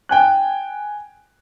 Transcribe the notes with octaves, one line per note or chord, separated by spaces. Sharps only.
G5 G#5 F#6